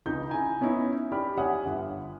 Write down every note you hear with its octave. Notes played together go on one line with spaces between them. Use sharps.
C#2 C#3 D#4 G6
E4 G#5 A#5
B3 C#4 D#4 E4
G4 D5 B5 F6
C#5 E5 F#5 G#5 D#6
G1